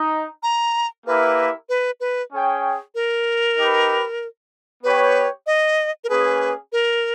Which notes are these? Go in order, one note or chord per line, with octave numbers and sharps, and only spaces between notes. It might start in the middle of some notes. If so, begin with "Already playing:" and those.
Already playing: D#4
A#5
A#3 E4 G4 A#4 B4 E5
B4
B4
C#4 G#4 C#5 G5
A#4
D#4 G4 B4
B3 G4 B4 C#5 G5
D#5
A#4
A#3 C#4 G#4 B4
A#4